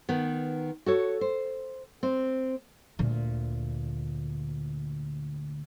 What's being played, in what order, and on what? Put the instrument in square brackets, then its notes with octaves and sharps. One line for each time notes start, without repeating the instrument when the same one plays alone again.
[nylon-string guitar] D#3 B3
F#4 A4 C#5
C5
C4
[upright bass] D2 A#2